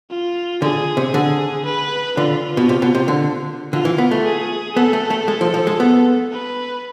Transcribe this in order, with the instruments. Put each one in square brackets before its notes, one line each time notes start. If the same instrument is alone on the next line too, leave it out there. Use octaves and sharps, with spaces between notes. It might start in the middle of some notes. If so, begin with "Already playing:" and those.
[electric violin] F4
[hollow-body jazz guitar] D3 [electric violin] G#4
[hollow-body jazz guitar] C3
[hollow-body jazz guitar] D3 [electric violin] G#4
[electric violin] B4
[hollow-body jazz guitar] D3 [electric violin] F4
[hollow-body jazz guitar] B2
C3
B2
C3
D3
[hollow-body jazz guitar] D3 [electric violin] F4
[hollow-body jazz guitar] E3
B3
A3
[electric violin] G#4
[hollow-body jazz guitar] B3 [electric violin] A4
[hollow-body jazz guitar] A3
A3
G#3
F3
F3
G#3
B3
[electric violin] B4